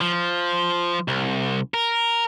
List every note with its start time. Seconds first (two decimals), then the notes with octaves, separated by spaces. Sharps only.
0.01 F3
1.08 C2
1.74 A#4